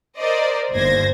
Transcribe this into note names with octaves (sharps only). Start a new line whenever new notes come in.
A#4 C5 D5 D#5
G1 D#2 C5 G#6 A#6